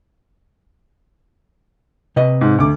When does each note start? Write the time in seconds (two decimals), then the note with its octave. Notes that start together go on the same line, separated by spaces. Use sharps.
2.16 C3 B4 D#5
2.41 G#2
2.58 D2 D6